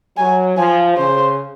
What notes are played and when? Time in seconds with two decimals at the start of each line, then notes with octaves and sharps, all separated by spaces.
0.17 F#3 G#5
0.57 F3 G#5
0.97 C#3 C5